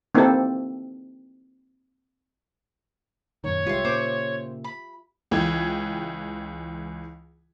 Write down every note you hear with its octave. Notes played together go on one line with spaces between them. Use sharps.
A#3 C4 D#4 E4 G4 A4
F#2 A#2 D#3 C#5
C2 G3 G#3 F4 G4 B4 E5 C6
A#2 C#3 A#3 C5 D6
B5
C#2 E3 E4 G5 G#6